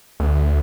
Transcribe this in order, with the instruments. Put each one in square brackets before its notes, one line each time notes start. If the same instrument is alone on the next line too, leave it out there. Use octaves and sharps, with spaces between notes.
[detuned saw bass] D2